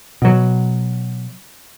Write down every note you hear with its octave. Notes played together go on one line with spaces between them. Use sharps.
B2 F#3